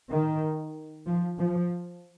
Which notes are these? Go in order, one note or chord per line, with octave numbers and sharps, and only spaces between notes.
D#3
F3
F3